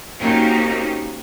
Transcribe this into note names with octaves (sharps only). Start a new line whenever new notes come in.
A#3 C4 C#4 D#4 F#4 G4